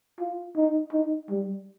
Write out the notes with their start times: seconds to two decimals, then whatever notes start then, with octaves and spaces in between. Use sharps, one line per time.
0.20 F4
0.56 D#4
0.93 D#4
1.30 G3